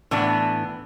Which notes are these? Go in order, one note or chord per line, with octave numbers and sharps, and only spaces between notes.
A2 E3 B3 D4